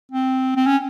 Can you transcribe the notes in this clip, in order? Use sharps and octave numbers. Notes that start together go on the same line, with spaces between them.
C4
C4
C#4